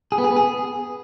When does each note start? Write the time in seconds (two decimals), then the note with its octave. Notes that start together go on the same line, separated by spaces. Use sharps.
0.12 G#4
0.18 B3
0.24 G#4
0.30 B3
0.36 G#4